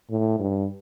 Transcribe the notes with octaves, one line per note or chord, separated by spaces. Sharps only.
A2
G2